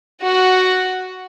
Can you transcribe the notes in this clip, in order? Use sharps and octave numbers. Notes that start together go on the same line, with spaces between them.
F#4 F#5